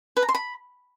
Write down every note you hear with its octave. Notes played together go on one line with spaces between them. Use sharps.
B4
A#5
C6
B5